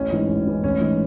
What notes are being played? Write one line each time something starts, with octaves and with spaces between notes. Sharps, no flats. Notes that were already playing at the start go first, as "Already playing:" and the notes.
Already playing: A1 C#4
G#2 E3 G#3
A1
G#2 E3 G#3
A1 C#4
G#2 E3 G#3